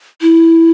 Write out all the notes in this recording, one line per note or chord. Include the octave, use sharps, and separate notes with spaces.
E4